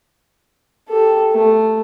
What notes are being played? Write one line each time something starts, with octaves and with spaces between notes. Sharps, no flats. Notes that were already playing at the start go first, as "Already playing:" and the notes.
G4 A4
A3